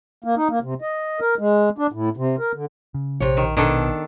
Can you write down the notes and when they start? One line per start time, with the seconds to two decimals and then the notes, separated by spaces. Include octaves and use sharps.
0.24 A#3
0.36 D#4
0.50 A#3
0.62 C3
0.82 D#5
1.20 A#4
1.39 G#3
1.78 D4
1.92 A2
2.17 C3
2.39 A#4
2.54 D3
2.94 C#3
3.20 A#1 C3 C#5
3.37 D#3
3.57 B2 D#3 D4 A4